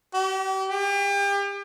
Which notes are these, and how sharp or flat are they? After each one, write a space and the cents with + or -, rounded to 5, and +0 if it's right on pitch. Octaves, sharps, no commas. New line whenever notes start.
G4 -40
G4 +35